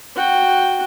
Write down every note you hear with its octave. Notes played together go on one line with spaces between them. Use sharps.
F#4 G5